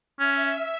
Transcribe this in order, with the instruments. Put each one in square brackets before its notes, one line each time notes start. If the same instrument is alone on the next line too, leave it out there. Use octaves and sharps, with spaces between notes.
[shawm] C#4 [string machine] E5